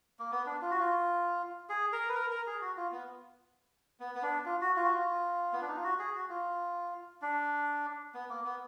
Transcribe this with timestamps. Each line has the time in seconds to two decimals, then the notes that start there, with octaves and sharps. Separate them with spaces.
0.19 A#3
0.32 B3
0.46 D4
0.62 F4
0.71 F#4
0.80 F4
1.69 G#4
1.93 A#4
2.09 B4
2.15 A#4
2.31 A#4
2.47 G#4
2.61 F#4
2.77 F4
2.92 B3
4.00 B3
4.15 B3
4.22 D4
4.46 F4
4.61 F#4
4.76 F4
4.85 F#4
4.91 F4
5.53 B3
5.61 D4
5.69 D#4
5.76 F4
5.83 F#4
5.99 G#4
6.15 F#4
6.29 F4
7.22 D4
8.14 B3
8.29 A#3
8.44 B3